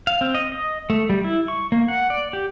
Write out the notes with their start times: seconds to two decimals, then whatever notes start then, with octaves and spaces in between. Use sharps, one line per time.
0.07 F5
0.21 C4
0.35 D#5
0.52 D#5
0.90 A3
1.10 G3
1.24 E4
1.48 C#6
1.72 A#3
1.88 F#5
2.10 D5
2.33 G4